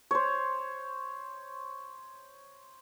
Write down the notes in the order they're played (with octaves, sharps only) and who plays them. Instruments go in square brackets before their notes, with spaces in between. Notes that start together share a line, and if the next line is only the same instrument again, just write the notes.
[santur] C5 C#5